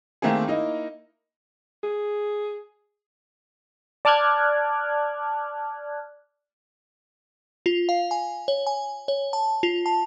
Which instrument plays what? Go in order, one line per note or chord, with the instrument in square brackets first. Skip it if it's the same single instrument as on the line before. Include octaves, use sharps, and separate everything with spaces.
[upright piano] D#3 A3 A#3 C4 G#4
A#3 D#4 E4
[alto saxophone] G#4
[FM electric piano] D5 A5 D6 F6 F#6 G#6
[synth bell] F4
F5
G#5
C#5
G#5
C#5
A5
F4
A5